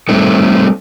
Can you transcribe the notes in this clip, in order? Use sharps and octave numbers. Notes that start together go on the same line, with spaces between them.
G3 A3 C4 D#4 A4